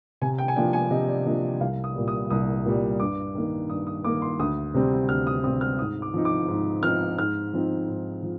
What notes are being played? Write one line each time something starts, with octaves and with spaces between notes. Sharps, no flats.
C3 G#5
G5
G#5
F3 A#3 D4 G5
G#5
C3 D#5
D5
F3 A#3 D4 D#5
C2 F5
D#6
A#2 G3
D#6
C2 D#6
A#2 G3
G2 D6
D#3 A#3
G2 D#6
D#6
D#3 A#3 D6
C6
D2 D#6
C3 G3 C4
D2 F6
D#6
C3 G3 C4 D#6
F6
G#2 D#6
D6
F3 C4 D#4
D6
G#2
F3 C4 D#4 F6
G#2 F6
F3 C4 D#4
G#2
F3